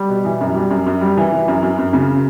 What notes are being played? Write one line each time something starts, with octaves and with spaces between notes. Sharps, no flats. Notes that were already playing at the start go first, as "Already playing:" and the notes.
Already playing: G3
B2
E3
F#2
G3
F#2
F#2
G3
E3
E3
F#2
F#2
F#2
C#3